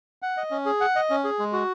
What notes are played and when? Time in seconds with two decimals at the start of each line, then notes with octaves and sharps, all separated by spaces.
0.22 F#5
0.37 D#5
0.51 C#4
0.66 G#4
0.81 F#5
0.96 D#5
1.10 C#4
1.24 G#4
1.39 G#3
1.53 F#4